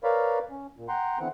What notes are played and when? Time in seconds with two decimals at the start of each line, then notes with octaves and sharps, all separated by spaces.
0.04 A#4 B4 C#5 D5 F5 B5
0.51 C#4
0.77 A#2
0.89 F#5 G5 A#5 C6
1.19 D3 E3 B3 C4 F#5